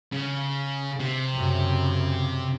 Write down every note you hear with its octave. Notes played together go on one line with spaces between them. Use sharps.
C#3
C3
F#2 C#3